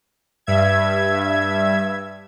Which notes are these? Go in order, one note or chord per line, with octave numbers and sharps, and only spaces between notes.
G2 E5 G#6